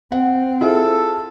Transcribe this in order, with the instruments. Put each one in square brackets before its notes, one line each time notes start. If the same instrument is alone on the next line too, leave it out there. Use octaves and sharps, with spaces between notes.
[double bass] C4 [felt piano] F#5
[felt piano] E4 F4 G#4 [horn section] A4